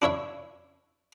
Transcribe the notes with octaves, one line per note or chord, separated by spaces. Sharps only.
D4 E4 C#5 E5